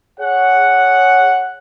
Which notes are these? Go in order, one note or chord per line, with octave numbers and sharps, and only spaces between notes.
G#4 C#5 F#5